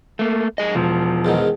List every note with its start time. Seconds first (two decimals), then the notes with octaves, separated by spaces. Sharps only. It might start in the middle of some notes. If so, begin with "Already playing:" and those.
0.19 A3 A#3
0.58 F#2 G#4 D#5
0.75 E1 F3
1.25 E2 G#2 D#3